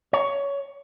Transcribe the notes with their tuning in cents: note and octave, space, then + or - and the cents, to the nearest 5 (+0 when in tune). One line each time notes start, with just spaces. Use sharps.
C#5 +15